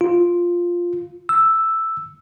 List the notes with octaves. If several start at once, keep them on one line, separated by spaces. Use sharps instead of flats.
F4
E6